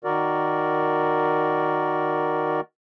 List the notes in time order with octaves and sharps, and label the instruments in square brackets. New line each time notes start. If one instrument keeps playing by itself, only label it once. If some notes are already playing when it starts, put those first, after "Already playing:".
[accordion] D#3 F#4 A#4 D5